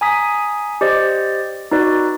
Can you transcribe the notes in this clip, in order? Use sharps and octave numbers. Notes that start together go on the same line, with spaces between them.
G#5 A#5 D#6 B6
G4 C5 D5 D#5
D#4 F#4 B4 D5